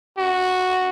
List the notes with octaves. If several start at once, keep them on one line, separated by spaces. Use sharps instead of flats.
F#4